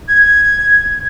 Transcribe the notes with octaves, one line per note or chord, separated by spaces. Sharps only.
G#6